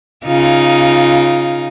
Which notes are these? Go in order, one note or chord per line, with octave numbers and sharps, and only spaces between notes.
C#3 D#4 F4